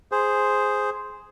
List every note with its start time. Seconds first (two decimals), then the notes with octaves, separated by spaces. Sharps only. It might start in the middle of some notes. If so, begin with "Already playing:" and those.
0.12 G#4 C5